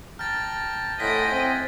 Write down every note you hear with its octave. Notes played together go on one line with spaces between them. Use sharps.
G5 A5 A#5 F6 A6
A2 C5 D#5 F#5 G#5 A6 B6 D7
C4